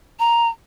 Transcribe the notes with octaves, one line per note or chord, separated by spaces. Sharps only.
A#5